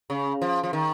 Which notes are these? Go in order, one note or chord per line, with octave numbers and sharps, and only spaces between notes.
C#3
F3
F3
D#3